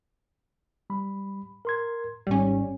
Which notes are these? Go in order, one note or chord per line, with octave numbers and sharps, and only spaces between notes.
G3 B5
A#4 C6 G#6
G#1 G#2 G3 C#4